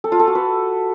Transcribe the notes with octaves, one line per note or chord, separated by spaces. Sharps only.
A4
F4
A4
F#4
B4